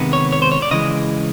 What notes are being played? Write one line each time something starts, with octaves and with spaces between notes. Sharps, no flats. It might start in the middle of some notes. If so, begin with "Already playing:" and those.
Already playing: C3 D#3 G#3 B3
C#5
C#5
C5
C#5
D5
C#3 E3 G#3 D#5